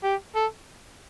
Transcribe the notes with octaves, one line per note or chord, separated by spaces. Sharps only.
G4
A4